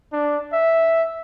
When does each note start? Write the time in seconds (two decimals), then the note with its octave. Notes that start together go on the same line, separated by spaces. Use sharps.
0.13 D4
0.53 E5